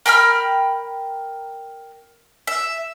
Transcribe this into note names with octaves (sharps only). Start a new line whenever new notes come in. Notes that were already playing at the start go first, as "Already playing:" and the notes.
A#4 G5 B5 F6
E5